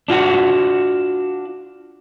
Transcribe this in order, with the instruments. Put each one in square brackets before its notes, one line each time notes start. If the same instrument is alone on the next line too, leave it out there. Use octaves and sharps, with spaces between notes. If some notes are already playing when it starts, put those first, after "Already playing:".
[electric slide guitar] D4 F4 F#4 F#5